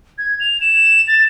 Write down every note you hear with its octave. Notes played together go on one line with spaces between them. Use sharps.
G#6
F7
E7
A6